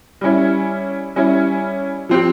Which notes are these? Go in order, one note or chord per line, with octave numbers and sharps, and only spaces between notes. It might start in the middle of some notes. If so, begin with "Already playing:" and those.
G3 C#4 E4
G3 C#4 E4
F3 C4 G4